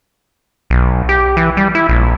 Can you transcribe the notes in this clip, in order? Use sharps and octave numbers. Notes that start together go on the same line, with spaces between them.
B1
G4
E3
G3
E4
A#1